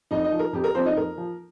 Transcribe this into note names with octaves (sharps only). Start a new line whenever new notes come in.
F2 D#4 D#5
D#4 D#5
F3
A#4
F2 G4
A#4
F3 C4 C5
D#4 D#5
F2 A#4
F3